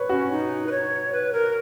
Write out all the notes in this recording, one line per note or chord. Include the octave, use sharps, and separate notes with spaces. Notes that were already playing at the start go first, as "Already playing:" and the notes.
Already playing: B4 C#5
C#4 F#4
D#4
B4
C#5
B4
A#4